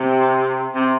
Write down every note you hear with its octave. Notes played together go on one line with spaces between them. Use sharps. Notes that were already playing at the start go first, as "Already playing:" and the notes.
Already playing: C3
C3